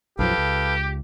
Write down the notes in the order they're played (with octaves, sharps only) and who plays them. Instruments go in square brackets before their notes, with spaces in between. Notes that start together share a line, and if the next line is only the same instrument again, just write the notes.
[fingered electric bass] B1 F#2 F3 [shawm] G4 [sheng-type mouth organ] A4 B4 F5
[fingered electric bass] C#2